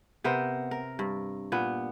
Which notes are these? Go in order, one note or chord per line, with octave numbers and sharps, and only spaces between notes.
C3 B3 A#4 C5
A#4
G2
A#2 B3